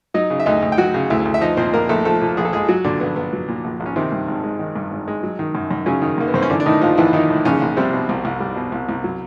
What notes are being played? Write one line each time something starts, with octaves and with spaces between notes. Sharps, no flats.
F#3 D#4 D#5
C#3
E5
D2 D#4 D#5
D2
G5
F#3 F#4 F#5
C#3
D2 E4 E5
D2
E5
F3 D#4 D#5
A#2 C4 C5
A#1 A#3 A#4
A#1 A3 A4
F3 A3 A4
A#2
A#1 G#4
A4
A#1 G#3 G#4
F#3 F#4
A#2 D3 D4
A#1 B3
A#1 B3
F#3
A#2
A#1
A#1
C#4
C3 D#3 C4
G2
G#1
G#3
D#3
G2
G#1
G#3
F#3
D#3
F#2
F#2
C#3 F#3 C#4
D#3
F#2 A#3
B3
F#2 C4
C#4
D3 E3 D4
D4
A2 D#3 D#4
A#1 F3 F4
A#1 E3 E4
D#3 E3 D#4
A2
A#1 C#3 C#4
A#1
C3 G3 C4
B2
C2
C2
G3
B2
C2
C2
F#3